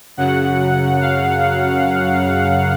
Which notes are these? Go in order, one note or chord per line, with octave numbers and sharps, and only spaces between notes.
F#2 C#3 F#3 F#5
F5